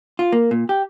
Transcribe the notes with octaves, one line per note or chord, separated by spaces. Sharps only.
F4
A#3
A#2
G4